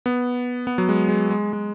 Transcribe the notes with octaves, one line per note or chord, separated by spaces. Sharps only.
B3
B3
F#3
G#3
G#3
G#3
G#3